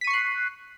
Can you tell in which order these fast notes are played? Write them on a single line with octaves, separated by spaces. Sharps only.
B6 D#7 C#6 C7 F#6